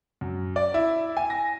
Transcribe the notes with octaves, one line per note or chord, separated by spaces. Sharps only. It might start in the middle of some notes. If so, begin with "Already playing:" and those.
F#2
D5
E4
G#5
A#6